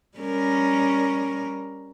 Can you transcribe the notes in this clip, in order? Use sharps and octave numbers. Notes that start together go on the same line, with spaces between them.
G3 C#4 A#4